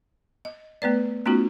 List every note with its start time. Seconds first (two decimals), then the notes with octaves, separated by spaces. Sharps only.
0.45 D#5
0.82 A3 B3 B4 D5
1.26 A3 B3 C#4 D#4 F4 F#4